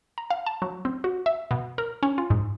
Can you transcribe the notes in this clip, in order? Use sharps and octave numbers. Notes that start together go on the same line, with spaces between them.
A#5
F5
A5
F#3
C4
F#4
E5
B2
A#4
C#4
F4
G#2